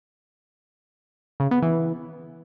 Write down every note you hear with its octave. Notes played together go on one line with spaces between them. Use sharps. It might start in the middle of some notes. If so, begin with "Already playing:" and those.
C#3
B3
E3